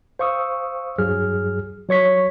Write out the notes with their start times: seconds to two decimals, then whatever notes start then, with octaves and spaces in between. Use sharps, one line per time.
0.19 C5 F5 C#6 D#6 E6
0.99 G2 F#3 G#4 F6
1.89 F#3 C#5 C#6 B6